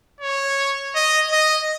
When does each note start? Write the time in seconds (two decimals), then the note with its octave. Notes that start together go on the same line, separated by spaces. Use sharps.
0.21 C#5
0.95 D#5
1.32 D#5